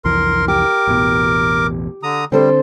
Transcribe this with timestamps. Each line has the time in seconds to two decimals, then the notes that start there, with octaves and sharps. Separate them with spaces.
0.05 C2 F2 E3 A#4 C6
0.48 G4 A#4 D6
0.87 A1 E2 B2
2.03 D3 A#5 D#6
2.32 D3 G3 C4 A4 C5